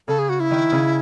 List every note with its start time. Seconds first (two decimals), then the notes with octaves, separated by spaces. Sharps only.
0.08 C#3 A4
0.19 G#4
0.29 F#4
0.40 E4
0.51 D#3
0.72 C#3